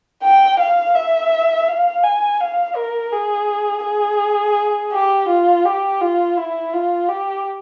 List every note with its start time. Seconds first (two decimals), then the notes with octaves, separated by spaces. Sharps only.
0.23 G5
0.60 F5
0.95 E5
1.68 F5
2.03 G#5
2.40 F5
2.76 A#4
3.12 G#4
3.84 G#4
4.93 G4
5.29 F4
5.65 G4
6.01 F4
6.37 E4
6.73 F4
7.09 G4